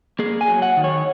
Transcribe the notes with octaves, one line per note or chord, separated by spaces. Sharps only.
A#3 G#4
G#5
F#3
F#5
D#3
C#5